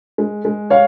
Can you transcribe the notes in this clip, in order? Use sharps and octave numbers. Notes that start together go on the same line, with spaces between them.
G#3
G#3
C#5 F5